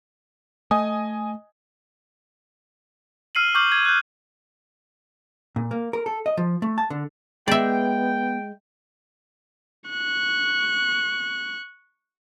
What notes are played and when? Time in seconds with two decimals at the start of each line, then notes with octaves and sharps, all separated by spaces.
0.71 A3 D#5 G#5 D#6
3.35 E6 F6 C7 D#7 F#7
3.55 C#6 D6 F6 G6 F#7
3.72 G#6
3.85 F#6 G6
5.56 A#2
5.71 A#3
5.93 A#4
6.06 A4
6.26 D#5
6.37 F3
6.62 A3
6.78 A5
6.90 D3
7.48 G#3 B3 D5 E5 G5
9.90 C#6 F#6